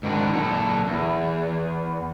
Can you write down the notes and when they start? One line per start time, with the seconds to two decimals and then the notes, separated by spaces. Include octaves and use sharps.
0.03 G#2 D#3 D4 F#4
0.32 A#2 F#3 A4
0.87 E2